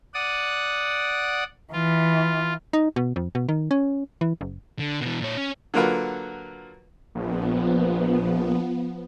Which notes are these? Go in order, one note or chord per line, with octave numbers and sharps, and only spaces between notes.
D5 F#5 D#6
E3 F4
D#4
B2
F2
B2
D#3
C#4
E3
F#1
D3
B2 E3
A#2 C#5
C#4
D3 F#3 A#3 F4 A#4 B4
A#1 F3 B3